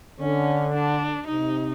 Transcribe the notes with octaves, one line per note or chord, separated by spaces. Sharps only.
D3 C#4
D4
C3 D#4